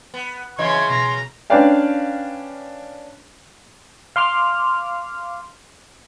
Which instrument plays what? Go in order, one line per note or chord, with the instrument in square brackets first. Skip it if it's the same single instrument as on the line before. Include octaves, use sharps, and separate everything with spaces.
[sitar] B3
[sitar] C#3 E3 F#3 [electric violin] C#5 G#6 [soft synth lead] D#5 [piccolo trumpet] C6
[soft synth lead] B2 [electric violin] A#5
[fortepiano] C#4 D4 B4 D5 F5 G5
[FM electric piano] F5 C6 D6 F6